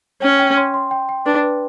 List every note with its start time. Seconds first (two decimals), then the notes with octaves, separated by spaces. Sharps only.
0.22 C#4 G5
0.39 G5
0.57 C6
0.74 C6
0.91 G5
1.09 G5
1.26 D4 B4
1.43 B4